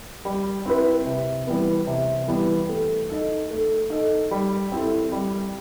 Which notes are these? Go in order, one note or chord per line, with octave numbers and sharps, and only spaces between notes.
G3
C4 E4 B4
C3
E3 G3 B3
C3
E3 G3 B3
A3
D#4 A4
A3
D#4 A4
G3
C4 E4 A4
G3